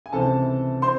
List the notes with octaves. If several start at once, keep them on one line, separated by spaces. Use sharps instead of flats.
G#5
C#2 C3 E3 C4 A4 A5
C4 C5 C6